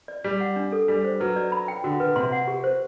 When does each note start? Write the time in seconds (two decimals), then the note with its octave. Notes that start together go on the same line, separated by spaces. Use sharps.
0.08 D5
0.24 G3 G4
0.41 F#5
0.56 D4
0.72 A4
0.88 G3 D4
1.04 C5
1.20 F#3 B4
1.36 D5
1.52 B5
1.68 G5
1.84 D3 F#4
2.00 D3 B4
2.16 C3 C6
2.32 F#5
2.48 G4
2.64 C5